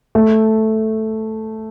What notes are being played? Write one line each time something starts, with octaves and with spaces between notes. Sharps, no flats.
A3